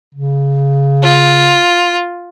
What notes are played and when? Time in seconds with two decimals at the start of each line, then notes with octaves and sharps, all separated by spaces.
0.15 C#3
1.03 F4